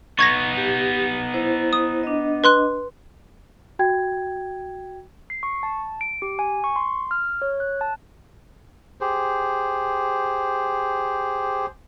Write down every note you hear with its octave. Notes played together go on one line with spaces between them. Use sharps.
B3 D#4 C#6 G#6 A#6
G4
E4 C5
D#6
D4 D#5
B4 C6 F#6
F#4 G5 G#6
C7
C#6
A5
D7
G4
G#5
C#6
C6
F6
C#5
F#6
A5
G4 G#4 C5